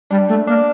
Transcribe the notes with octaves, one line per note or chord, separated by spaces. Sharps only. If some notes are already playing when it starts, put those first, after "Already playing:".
G3 D4
A3
A#3 D4